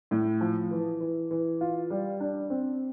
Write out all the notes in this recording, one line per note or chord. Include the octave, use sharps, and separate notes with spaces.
A2
F3
E3
E3
E3
F4
G3
D4
C4